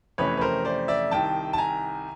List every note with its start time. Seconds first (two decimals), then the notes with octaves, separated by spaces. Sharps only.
0.18 F2 C3 E3 A3 C#4 B4 C#5
0.37 B4
0.41 A#4 C5
0.65 C5 D5
0.88 D5 E5
1.11 C2 C3 D#3 G5 A5
1.53 A5
1.58 G#5 A#5